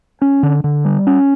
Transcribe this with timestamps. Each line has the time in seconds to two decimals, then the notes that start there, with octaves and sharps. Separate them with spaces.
0.22 C#4
0.43 D3
0.64 D3
0.85 G3
1.07 C#4